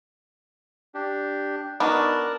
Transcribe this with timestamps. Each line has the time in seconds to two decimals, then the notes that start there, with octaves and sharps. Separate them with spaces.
0.94 D4 G4
1.80 B3 D4 D#4 F#4 A#4 D5 A5